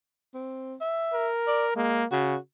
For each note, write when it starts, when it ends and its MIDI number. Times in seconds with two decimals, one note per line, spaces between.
0.34 0.75 60
0.81 1.28 76
1.13 1.73 70
1.48 1.66 74
1.76 2.03 56
1.76 2.05 58
2.11 2.36 49
2.11 2.37 66